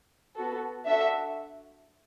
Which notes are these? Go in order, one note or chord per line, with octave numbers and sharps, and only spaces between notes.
B3 F#4 A4
D4 F#4 A4 E5